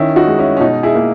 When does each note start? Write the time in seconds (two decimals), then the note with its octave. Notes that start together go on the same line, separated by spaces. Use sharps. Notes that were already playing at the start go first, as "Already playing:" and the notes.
Already playing: D#3 C#4 E4
0.16 D#4 F#4
0.27 G#3
0.39 C#4 E4
0.57 C#4
0.61 B2 D#4
0.83 E4 G#4
0.95 A#3